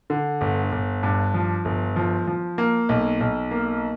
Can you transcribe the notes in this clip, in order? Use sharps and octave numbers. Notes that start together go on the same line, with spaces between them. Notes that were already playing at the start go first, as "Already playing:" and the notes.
D3
G1
G1
G2
F3
G1
F3
F3
A#3
B1
B1
A#3